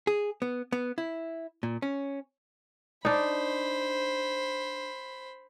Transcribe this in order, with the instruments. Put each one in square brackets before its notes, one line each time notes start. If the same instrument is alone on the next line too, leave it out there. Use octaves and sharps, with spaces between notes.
[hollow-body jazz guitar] G#4
B3
B3
E4
A#2
C#4
[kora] D4 D#4 [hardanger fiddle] C5 B5